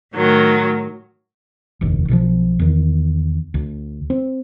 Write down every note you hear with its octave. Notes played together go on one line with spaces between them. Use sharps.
A2 D#3 F#3
F1 A#1 D#2
B1 B2 D3 F3
E2 D#3
D2
C4